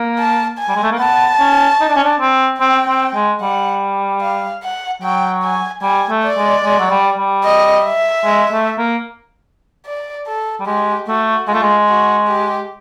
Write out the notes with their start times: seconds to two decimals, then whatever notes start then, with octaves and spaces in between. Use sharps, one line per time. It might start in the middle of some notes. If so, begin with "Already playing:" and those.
Already playing: A#3
0.19 A5
0.59 G#5
0.68 G3
0.76 G#3
0.83 A3
0.92 A#3
0.99 B3 A5
1.40 C#4
1.81 D#4
1.88 D4
1.96 C#4
2.04 D4
2.20 C4
2.60 C4 G5
2.88 C4
3.15 G#3
3.41 G3 F#5
4.22 F5
4.63 F#5
5.02 F#3 G5
5.43 G#5
5.83 G3 G#5
6.10 A3
6.23 D5
6.37 G#3
6.64 G#3
6.79 F#3
6.90 G3
7.18 G3
7.44 D#5
7.85 E5
8.25 G#3
8.52 A3
8.78 A#3
9.86 D5
10.27 A4
10.60 G3
10.66 G#3 G4
11.07 A3 F#4
11.48 G#3 F4
11.54 A3
11.62 G#3
11.88 F#4
12.28 G4